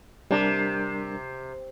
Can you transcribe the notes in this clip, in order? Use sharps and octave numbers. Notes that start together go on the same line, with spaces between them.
C3 G3 D4 A#4